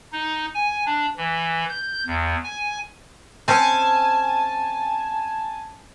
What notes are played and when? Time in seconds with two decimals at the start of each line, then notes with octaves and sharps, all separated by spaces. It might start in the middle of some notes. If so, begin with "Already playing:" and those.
0.13 D#4
0.55 G#5
0.86 D4
1.17 E3
1.70 G6
2.07 E2
2.44 G#5
3.48 C4 C#4 G#5 A5